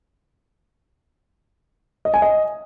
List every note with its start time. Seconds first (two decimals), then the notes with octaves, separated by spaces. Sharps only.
2.05 D#5
2.14 G#5
2.22 D#5